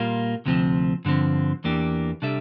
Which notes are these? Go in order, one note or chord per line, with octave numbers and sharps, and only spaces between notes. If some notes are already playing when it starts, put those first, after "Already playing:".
Already playing: A#2 G3 A#3 F4
D2 C3 F3 C4
G2 D3 F3 C4
E2 E3 A#3 D4 G4
C3 G3 D4 A4 E5